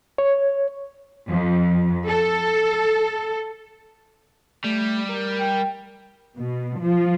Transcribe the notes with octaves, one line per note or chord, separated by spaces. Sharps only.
C#5
F2
A4
G3 A3
A#4
G5
B2
F3